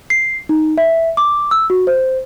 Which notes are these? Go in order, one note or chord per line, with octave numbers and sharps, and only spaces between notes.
C7
D#4
E5
D6
E6
F#4
C5